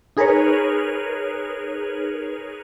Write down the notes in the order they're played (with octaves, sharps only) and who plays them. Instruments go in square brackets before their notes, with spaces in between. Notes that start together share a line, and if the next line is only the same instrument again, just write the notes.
[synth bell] D#4 G#4 A#4 B4 C#5